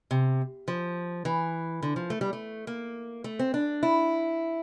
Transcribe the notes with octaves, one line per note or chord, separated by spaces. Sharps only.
C3
F3
E3
D3
F3
A3
G3
A3
A#3
A3
C4
D4
E4